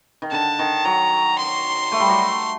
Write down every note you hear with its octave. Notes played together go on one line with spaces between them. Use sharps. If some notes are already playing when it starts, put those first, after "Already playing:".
D#3
D3 A5
D#3
F#3 A#5
C6
A3
G3
F#3